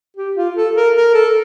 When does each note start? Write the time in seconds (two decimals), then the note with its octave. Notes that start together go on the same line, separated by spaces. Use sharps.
0.17 G4
0.36 F4
0.56 A4
0.75 A#4
0.96 A#4
1.14 A4